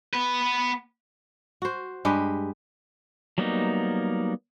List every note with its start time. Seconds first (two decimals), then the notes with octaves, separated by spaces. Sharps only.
0.14 B3 B4
1.62 F#4 C5
2.05 G2 G#3 G4 B4
3.38 F#3 G3 A#3 B3 D#4